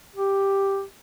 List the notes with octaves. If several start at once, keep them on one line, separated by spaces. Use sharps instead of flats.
G4